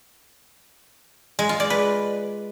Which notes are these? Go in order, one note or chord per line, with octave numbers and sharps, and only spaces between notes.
G#3
F4
D5
B4